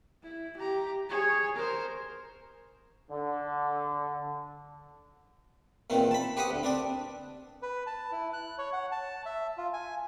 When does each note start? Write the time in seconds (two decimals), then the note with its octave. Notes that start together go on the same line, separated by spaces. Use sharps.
0.22 E4
0.57 G4 A#5
1.10 G#4 C#5
1.56 A#4 C5
3.11 D3
5.90 E2 A#2 D#3 C4
6.11 A5 B5
6.37 G4 B4 C5 F#5 D#6
6.51 D2
6.63 C4 D4 D5
7.62 B4
7.87 A5
8.12 E4
8.33 F#6
8.58 C#5
8.73 F#5
8.92 A5
9.26 E5
9.58 F4
9.73 G#5